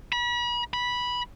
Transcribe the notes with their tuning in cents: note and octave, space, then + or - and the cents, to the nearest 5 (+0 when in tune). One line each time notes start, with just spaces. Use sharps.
B5 -40
B5 -10